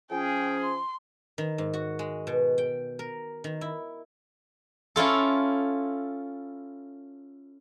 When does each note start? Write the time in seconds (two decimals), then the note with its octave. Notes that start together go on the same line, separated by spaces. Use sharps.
0.11 F3 C#4 G#4 G5
0.60 C6
1.38 D#3
1.58 G#2
1.73 F#4
1.99 G#3
2.27 B2
2.58 G5
2.99 A#4
3.44 D#3
3.61 E4
4.96 C#4 E4 F4 A4